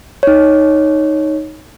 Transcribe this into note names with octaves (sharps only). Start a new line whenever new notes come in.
D#4 C#5